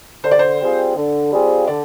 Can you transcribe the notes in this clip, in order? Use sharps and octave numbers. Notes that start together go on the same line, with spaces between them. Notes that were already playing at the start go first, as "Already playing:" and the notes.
D3 C5
D5
C5
G3 C4 F4 G#4
D3
G3 C4 F4 G#4
D3 D5